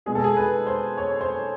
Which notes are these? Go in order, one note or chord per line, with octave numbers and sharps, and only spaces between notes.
B2 G#3 B3 G#4
A4
G#4
B4
C5
C#5
C5